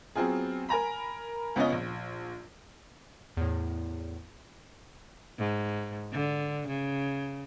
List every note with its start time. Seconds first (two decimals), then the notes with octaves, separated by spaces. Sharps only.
0.15 F#3 B3 C4 F4 G#4
0.69 A#4 G#5 A#5 B5
1.56 C#2 B3 C#4 D#5
1.72 A#1
3.37 E2 A2
5.38 G#2
6.12 D3
6.67 C#3